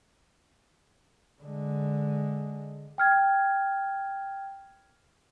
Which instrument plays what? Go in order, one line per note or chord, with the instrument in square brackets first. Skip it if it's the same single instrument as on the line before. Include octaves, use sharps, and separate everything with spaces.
[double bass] D3 G#3
[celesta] G5 F6 G#6